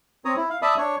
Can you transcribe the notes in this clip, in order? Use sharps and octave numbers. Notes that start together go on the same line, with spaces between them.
C4 C#5 A#5 D#6
E4
F5
D5 E5 A5 B5 D#6
D4 C#5